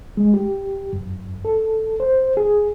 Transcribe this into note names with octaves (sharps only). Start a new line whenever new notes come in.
G#3
G4
F#2
A4
C5
G#4